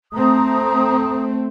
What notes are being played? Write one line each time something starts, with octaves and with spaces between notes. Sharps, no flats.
A3 C4 A#5 D#6